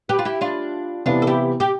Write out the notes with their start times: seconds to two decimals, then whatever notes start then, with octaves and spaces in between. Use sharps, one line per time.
0.09 G4 B4
0.19 F4
0.25 E4 G4
0.41 D4 F4
1.06 C3 E3 B3 D4 F4
1.22 A4
1.27 E4 G4
1.60 G4